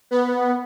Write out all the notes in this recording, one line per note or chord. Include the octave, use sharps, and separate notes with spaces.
B3